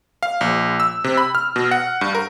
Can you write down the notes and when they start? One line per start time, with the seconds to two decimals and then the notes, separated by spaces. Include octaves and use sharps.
0.23 F5
0.41 A#1
0.80 E6
1.04 C3
1.18 B5
1.35 F6
1.56 B2
1.71 F#5
2.01 G2
2.15 A#4